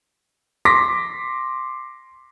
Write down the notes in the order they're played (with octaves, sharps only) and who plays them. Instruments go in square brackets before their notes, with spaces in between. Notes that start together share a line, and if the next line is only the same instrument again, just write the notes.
[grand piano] C6 D6 A#6 B6